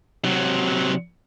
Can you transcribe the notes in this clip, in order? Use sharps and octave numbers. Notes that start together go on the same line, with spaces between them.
C3 F#3